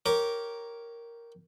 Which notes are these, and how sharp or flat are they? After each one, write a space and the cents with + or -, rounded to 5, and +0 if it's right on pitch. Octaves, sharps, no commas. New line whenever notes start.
G4 -15 A#4 +0 C#5 +0